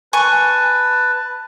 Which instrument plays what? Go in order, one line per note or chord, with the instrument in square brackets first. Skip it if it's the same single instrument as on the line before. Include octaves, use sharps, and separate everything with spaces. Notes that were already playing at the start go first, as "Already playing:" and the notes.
[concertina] B4 A5 [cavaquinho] G#5 C#6